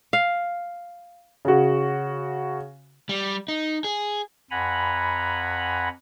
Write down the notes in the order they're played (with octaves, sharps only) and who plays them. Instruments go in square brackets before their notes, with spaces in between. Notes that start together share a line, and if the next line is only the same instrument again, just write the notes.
[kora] F5
[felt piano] C#3 F#4
[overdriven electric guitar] G3
D#4
G#4
[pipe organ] F2 F#5 G#5 A#5 B5